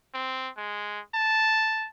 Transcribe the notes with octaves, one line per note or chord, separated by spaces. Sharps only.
C4
G#3
A5